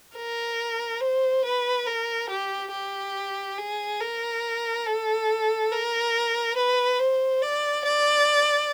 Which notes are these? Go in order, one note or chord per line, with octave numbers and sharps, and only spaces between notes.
A#4
C5
B4
A#4
G4
G4
G#4
A#4
A4
A#4
B4
C5
D5
D5